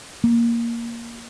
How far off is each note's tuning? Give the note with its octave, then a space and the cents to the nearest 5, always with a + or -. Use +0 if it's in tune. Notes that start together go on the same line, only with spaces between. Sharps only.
A#3 +5